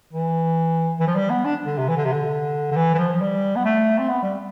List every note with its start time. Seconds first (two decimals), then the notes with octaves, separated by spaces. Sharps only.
0.13 E3
1.00 E3
1.08 F3
1.15 G3
1.30 B3
1.45 D4
1.66 D3
1.78 C3
1.89 E3
1.97 D3
2.05 C3
2.12 D3
2.72 D3
2.76 E3
2.94 E3
2.98 F3
3.14 F3
3.21 G3
3.56 B3
3.65 A3
3.99 C4
4.09 B3
4.23 G3